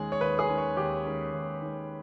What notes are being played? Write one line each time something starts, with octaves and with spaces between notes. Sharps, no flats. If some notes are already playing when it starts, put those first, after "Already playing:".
Already playing: D#2 D#3 G#3 C#4 G#4
C#5
D#2 B4
G#4
D#3 G#3 C#4
C#5
D#2 G4
D#3 G#3 C#4
D#2
D#3 G#3 C#4